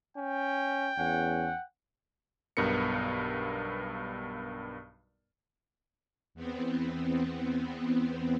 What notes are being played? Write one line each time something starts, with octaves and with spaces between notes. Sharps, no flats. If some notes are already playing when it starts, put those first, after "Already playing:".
C#4 G5
E2 C#4 F#5
B1 G2 B3 A#4 C#7
E2 B3 C4